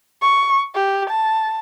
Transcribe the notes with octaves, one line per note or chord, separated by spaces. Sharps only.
C#6
G4
A5